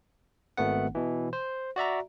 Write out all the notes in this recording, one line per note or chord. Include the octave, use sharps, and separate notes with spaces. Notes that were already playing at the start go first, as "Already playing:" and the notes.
G#1 A3 B3 F#5
B2 E3
C5
F#4 D5 E5 A#5